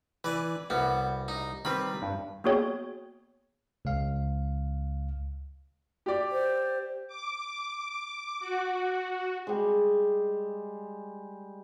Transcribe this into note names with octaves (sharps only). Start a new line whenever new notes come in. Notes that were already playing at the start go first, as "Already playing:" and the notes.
E3 B4 D5 G#5
C2 G3 B3 F#4
D#4
D#3 G3 C4 B4 B5
G2
A#3 B3 F#4 G#4 C#5 G5
C#2 F5
G4 D5
C5
D6
F#4
G3 G#3